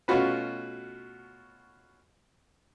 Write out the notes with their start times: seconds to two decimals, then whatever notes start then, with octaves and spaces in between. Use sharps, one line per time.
0.08 B2 A3 C#4 F4 F#4 B4